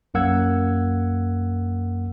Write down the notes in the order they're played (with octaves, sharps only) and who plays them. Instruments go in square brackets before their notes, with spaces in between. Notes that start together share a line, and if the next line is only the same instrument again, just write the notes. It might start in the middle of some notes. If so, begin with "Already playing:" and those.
[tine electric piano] B1 F#2 A#3 F#5 E6 G#6